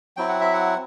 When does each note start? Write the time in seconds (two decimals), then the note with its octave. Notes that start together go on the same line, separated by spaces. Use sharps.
0.17 F#3 C4 E4 G5
0.29 F#5
0.41 E5
0.53 F#5